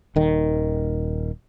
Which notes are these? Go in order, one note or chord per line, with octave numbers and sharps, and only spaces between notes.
D#1 D#3